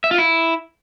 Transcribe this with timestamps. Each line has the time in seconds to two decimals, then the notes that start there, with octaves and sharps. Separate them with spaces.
0.04 E5
0.11 F4
0.18 E4